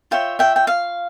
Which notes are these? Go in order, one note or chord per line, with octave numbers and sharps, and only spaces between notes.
F4 C#5 E5 G5
E5 G5
G5
F5